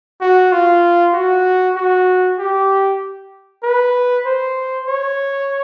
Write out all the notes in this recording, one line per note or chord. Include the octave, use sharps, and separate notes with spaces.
F#4
F4
F#4
F#4
G4
B4
C5
C#5